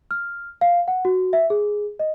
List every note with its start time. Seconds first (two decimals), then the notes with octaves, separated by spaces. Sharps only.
0.11 F6
0.61 F5
0.88 F#5
1.05 F#4
1.33 E5
1.50 G#4
1.99 D#5